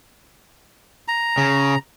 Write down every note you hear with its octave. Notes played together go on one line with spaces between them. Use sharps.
A#5
C#3